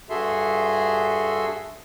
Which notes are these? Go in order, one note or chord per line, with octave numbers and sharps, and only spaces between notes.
G2 F#4 G#4 A4 E5 C6